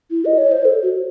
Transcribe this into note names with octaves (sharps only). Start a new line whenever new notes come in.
E4
D#5
C#5
C5
A4
F#4